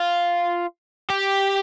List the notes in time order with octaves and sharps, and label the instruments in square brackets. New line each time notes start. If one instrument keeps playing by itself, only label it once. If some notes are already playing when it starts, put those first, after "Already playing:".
Already playing: [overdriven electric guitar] F4
G4